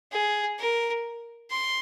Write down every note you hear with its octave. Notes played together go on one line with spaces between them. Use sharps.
G#4
A#4
C6